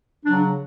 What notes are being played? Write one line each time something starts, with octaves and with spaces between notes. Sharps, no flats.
C#3 F#3 D4